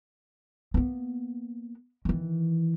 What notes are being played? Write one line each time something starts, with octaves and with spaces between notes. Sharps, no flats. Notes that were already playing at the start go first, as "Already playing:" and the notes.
A#3 B3
D#3 E3